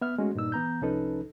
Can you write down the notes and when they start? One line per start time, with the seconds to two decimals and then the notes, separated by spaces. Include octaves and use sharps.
0.01 B3 E5 F6
0.18 G#3 A3 C#4 F#4
0.35 G2 A#2 D#4 E6
0.52 E3 B3 A#5 G6
0.82 C2 F3 C#4 D#4 A4 B4